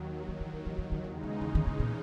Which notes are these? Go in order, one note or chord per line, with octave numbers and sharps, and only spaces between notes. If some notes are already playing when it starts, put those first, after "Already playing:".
Already playing: D#2 D#3 F#3
D#3
E3
D#3
E3
D#3
D#3
E2 C#3 E3 G#3 D#4
D#3
D#3
D#3
C#3
A#2